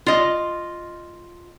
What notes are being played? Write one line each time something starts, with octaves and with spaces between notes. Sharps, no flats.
F4 D#5